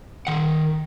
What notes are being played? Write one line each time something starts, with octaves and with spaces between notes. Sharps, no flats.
D#3 F#5